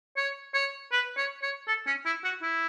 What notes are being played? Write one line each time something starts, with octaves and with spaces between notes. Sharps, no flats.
C#5
C#5
B4
C#5
C#5
A4
C#4
E4
F#4
E4